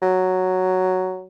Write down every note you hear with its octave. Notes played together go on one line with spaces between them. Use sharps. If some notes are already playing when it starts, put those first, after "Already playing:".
F#3